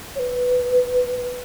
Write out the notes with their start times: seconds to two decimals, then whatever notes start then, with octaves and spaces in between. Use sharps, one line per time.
0.15 C#5
0.19 B4